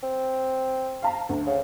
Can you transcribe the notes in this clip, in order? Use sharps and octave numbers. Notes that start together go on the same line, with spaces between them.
C4
F5 A5 A#5
D2
C#3